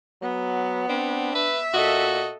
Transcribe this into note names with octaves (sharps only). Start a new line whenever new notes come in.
F#3 B3
C4 D4
B4 E5
A#2 F#4 A4 D#5